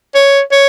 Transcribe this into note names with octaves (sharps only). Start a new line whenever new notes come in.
C#5
C#5